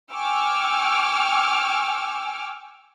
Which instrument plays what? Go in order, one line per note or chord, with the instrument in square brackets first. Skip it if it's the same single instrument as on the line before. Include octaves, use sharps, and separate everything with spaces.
[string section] G5 G#5 C#6 D6 E6 F6